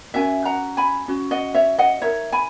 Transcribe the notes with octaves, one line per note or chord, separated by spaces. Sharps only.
C#4 F#4 A#4 E5 G#5
F#5 A#5
G#5 B5
C#4 F#4
D#5 F#5
C#5 E5
D#5 F#5
D#4 A#4 C#5 E5
G#5 B5